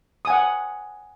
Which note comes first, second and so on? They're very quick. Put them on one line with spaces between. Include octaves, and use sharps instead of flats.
D#6 G#5 F#5